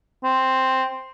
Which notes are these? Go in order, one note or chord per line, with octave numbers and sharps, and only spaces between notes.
C4